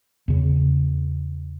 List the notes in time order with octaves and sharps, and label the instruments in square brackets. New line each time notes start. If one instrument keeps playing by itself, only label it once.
[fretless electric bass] E2 C#3